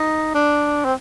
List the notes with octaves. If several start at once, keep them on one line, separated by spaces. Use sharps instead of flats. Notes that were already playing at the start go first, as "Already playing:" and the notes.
Already playing: D#4
D4
C4